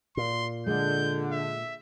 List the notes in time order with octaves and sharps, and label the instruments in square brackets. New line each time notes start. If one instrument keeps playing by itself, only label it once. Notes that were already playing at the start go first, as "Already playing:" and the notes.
[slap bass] A#2 [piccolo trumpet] C6
[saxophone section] D3 [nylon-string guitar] G#3 [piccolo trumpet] G6
[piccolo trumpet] E5